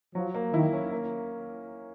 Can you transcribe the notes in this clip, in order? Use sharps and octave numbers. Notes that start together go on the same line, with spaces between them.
F3 F#3
A#3
D#3 E4
C#4
A#3